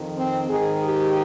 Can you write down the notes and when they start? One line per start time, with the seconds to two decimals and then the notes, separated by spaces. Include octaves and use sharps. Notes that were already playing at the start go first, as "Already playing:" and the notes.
Already playing: F2 D#3
0.16 C4
0.49 G#2 D#3 G#4
0.83 G4